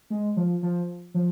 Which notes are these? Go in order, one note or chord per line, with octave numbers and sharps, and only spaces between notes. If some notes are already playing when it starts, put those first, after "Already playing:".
G#3
F3
F3
F3